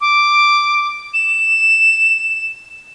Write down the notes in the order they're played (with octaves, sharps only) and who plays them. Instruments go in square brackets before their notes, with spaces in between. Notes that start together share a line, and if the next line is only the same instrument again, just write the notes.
[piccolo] D6
E7